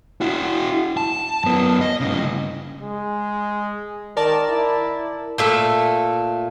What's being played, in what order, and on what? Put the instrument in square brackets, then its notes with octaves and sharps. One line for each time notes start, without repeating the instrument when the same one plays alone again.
[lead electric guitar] E4 F#4
A5
F#2 B3
D#5
G2 C#3
[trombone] G#3
[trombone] D#3 [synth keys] A#4 D5 A5
[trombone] E4
[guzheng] A#2 A3 E5